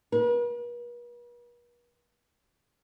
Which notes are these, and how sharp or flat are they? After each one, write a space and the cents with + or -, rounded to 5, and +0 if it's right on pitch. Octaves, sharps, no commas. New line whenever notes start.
B4 -45